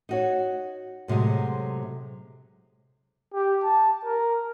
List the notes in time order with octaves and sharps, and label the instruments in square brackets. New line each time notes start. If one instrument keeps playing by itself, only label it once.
[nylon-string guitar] D#4 F#4 C#5
A2 C3 F#3 G#3
[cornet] G4
A5
A#4